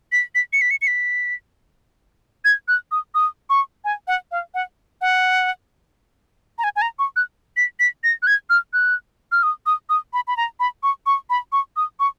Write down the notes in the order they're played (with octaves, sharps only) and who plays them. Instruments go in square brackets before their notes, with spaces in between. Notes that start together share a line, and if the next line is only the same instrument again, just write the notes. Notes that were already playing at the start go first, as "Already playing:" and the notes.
[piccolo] B6
B6
C#7
B6
C#7
C#7
B6
G#6
F#6
D#6
D#6
C#6
G#5
F#5
F5
F#5
F#5
A#5
G#5
G#5
A#5
C#6
F#6
B6
B6
A#6
F#6
G#6
F6
F#6
F6
D#6
D#6
D#6
B5
B5
A#5
B5
C#6
C#6
B5
C#6
D#6
C#6